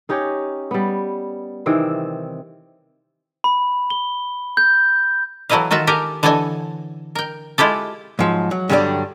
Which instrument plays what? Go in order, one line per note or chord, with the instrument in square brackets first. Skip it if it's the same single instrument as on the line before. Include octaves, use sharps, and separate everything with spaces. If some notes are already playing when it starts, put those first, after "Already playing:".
[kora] C#4 D#4 G4 C#5
G3 B3
C3 D#3 E3 C4
[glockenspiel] B5
G7
G6
[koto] E3 F#3 A3 E4 D#5 F5
D#3 F4 F#4 E5 A5
G4 A4 A#4 G#5
D3 E3 A4 C#5 D#5 G#5
A#4 G5
G#3 E4 F4 G4 A4
[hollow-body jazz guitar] G#2 F3 F#3
F#3
G2 D3 F#3 G3 C4 D4